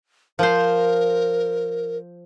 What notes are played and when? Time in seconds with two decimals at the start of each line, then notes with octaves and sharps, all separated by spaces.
0.39 F3 A#4 C5